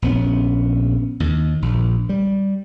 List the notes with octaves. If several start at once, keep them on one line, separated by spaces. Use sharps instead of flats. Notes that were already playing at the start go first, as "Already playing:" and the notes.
A#1 B3 C#4
D#2
A#1
G3